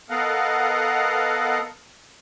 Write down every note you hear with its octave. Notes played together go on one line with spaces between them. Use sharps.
B3 A4 A#4 D#5 F5 F#5